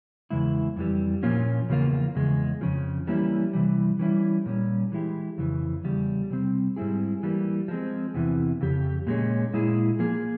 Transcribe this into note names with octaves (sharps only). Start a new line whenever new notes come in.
E2 C#3 G#3 E4
F2 E3 G3
A#2 F3 A#3 C#4 F4
E2 C#3 F3 A#3 F4
E2 C#3 G#3
F2 C#3 F3
E3 G3 A#3 C#4 E4
C3 E3 G3
E3 G3 C#4 E4
A#2 G3 C#4
E3 G#3 E4 G4
F2 C#3 E3
E2 C#3 G3
C3 G3 C4
G#2 G3 C4 E4 G#4
E3 G3 A#3
F3 G#3 C4
E2 C3 E3
F2 C#3 G4
A#2 G#3 C#4
A#2 G#3 E4 G#4
F3 A#3 F4 G#4